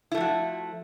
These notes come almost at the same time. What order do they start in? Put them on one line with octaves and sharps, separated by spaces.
E4 A3 F3 F#4